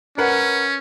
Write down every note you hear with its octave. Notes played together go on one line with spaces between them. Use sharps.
C#4 A#4 B4 F#5